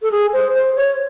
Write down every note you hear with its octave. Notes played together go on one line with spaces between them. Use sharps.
A4
G#4
C5
C5
C#5